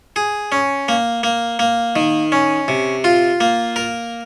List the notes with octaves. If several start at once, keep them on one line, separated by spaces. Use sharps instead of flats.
G#4
C#4
A#3
A#3
A#3
D#3
C#4
C3
F4
A#3
A#4